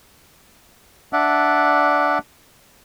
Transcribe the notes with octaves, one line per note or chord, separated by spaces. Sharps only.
D4 D5 E5 F#5